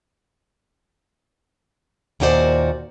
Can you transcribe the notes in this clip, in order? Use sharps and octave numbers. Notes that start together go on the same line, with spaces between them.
D#2 A#2 C#4 F#4 C5 D5